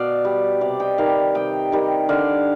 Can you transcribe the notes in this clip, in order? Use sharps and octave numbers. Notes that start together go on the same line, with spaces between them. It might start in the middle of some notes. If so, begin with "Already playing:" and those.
Already playing: B2 D5 F5
G3
C3 D5 F5
D#5 G5
D#3 G3 D5 F5
C3 D#5 G5
D#3 G3
D3 D5 F5